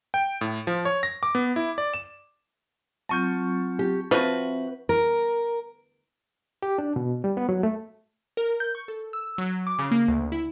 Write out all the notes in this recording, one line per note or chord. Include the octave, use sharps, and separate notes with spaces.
G5
A2
F3
C#5
A#6
D6
B3
E4
D5
E7
F#3 C4 F4 A5 C#6 G6
G4
F3 C4 F#4 B4 E5
A#4
G4
D4
B2
G3
B3
F#3
A3
A#4
G6
C#6
A4
E6
F#3
D6
C#3
A#3
D2
E4